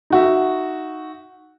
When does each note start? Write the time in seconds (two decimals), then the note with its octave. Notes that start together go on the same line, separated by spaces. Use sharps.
0.10 D#4 F#4 E5